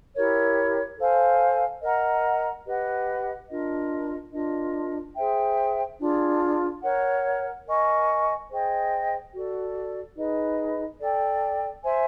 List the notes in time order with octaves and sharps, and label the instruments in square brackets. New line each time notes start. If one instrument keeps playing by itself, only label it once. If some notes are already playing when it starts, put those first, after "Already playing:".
[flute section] E4 G4 A#4 C#5
A4 C5 F5 G#5
A#4 D#5 F#5 A#5
G4 B4 D#5 F#5
D4 F4 A#4 D#5
D4 F4 A#4 D#5
G#4 C5 E5 G5
D4 F4 G#4
A#4 C#5 F#5
A#4 D#5 G#5 C#6
G#4 C5 D#5 G5
F#4 A4 D5
D#4 G#4 B4 D#5
A4 D5 G5
C5 E5 G#5